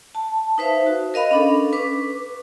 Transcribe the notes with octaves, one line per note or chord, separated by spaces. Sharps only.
A5
D#4 B4 C5 E5 F5
F#4
A#4 D#5 F5 B5
C#4 D4 A4
B4 C#6 D6